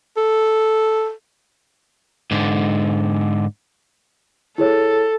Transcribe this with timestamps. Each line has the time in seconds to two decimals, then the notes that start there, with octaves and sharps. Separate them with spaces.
0.17 A4
2.31 G#2 D3
4.58 E4 G#4 A4 C#5